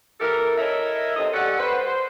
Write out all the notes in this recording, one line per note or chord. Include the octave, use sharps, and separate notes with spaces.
E3 G4 A4 A#4
E4 A4 A#4 C#5 D#5 E5
C3 C4 D#4 A4 D#5
G3 C#4 A4 F#5
B4 C5
C5